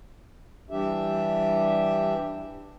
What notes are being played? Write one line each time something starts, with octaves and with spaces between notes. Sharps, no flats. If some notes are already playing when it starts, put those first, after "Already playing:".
E3 G3 D4 G4 E5